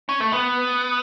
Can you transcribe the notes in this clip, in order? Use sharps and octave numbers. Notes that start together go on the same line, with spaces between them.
C#4
A3
B3